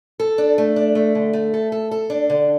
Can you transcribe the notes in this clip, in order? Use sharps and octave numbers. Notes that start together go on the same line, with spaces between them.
A4
D4
A3
D4
A3
D3
A3
A4
A4
A4
D4
D3